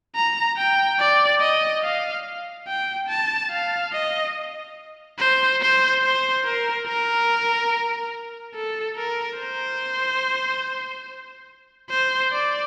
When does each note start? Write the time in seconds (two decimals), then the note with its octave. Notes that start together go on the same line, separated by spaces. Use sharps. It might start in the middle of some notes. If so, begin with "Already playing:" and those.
0.16 A#5
0.58 G5
1.00 D5
1.41 D#5
1.84 F5
2.68 G5
3.09 A5
3.51 F5
3.93 D#5
5.19 C5
5.61 C5
6.03 C5
6.45 A#4
6.87 A#4
8.55 A4
8.97 A#4
9.39 C5
11.90 C5
12.32 D5